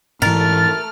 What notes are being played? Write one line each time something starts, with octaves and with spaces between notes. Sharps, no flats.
G#2 E3 A3 A#4 F6 A6